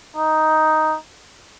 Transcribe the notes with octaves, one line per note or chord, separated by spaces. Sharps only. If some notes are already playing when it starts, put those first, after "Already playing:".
D#4